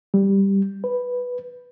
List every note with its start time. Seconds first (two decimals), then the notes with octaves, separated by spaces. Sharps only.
0.14 G3
0.84 B4